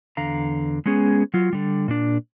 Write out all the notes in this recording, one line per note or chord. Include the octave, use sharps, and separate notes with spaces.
E2 D3 F5 A#5
G#3 B3 C#4 G#4
F#3 F4
D3 G3
A#2 D4